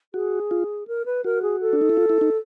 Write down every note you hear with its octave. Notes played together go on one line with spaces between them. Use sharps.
F#4 G#4
F4
A#4
B4
F#4 A#4
G#4
A4
D4
D#4
E4
F4
E4
D#4